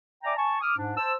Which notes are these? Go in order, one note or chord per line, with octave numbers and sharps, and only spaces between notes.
D5 E5 G5 G#5 A#5 D6
G#5 A5 C#6
D6 D#6 F6
G#2 D4
C5 A5 E6